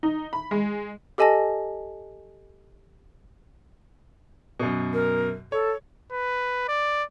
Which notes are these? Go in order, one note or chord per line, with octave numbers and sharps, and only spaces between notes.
D#4
B5
G#3
G4 A4 D#5 G#5 A5 A#6
F#2 B2
A#4
A4 C#5
B4
D5